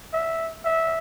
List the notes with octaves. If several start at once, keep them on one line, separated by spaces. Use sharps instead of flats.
E5
E5